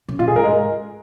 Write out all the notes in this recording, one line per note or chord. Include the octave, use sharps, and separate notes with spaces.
C#3
A#2 F4
G#4
G#2 A#4
G#3